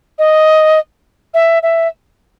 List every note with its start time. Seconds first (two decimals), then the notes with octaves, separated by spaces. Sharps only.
0.19 D#5
1.34 E5
1.63 E5